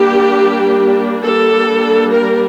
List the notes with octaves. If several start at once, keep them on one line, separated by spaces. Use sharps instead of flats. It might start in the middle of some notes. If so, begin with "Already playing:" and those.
Already playing: G3 A#3 D4 G4
G3 A#3 D4 A4
A#4